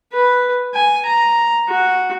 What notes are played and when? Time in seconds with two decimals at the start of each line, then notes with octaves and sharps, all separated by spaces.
0.13 B4
0.74 G#5
1.06 A#5
1.69 F#4